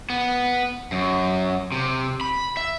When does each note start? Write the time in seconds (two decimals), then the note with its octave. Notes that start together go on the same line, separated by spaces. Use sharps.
0.10 B3
0.92 F#2
1.72 C3
2.21 B5
2.57 E5